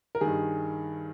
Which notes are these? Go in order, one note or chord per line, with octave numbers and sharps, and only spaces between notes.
A#4
G2 D#3 G#4